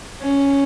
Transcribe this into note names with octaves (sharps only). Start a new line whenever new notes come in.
C#4